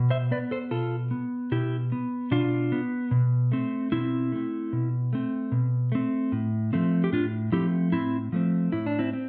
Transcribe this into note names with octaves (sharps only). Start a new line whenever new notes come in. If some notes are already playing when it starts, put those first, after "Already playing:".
Already playing: B2
C5 E5
B3 B4 D5
A4 C5
B2 F4 A4
B3
B2 E4 G4
B3
B2 D4 F4
B3
B2
A3 C4
B2 C4 E4
A3 C4
B2
A3 C4
B2
A3 C4
A2
F3 A3 C4
G4
A2 D4 F4
F3 A3 C4 E4 G4
A2 C4 E4
F3 A3 C4
A2 E4
D4
C4 E4
C4